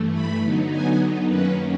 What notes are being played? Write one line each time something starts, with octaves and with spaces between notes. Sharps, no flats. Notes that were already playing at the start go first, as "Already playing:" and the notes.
Already playing: G2 E3 A3
B5
D3 F#3 B3 D#4
G#5
F#2 D#3 F#3 A#3 C#4 B4